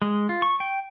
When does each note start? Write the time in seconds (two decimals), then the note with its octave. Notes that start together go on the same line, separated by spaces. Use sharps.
0.02 G#3
0.29 F4
0.42 C#6
0.60 G5